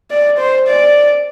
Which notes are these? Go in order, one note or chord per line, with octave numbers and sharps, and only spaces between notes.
D5
C5
D5